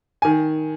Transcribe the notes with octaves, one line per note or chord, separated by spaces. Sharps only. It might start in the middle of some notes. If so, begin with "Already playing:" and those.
G#5
D#3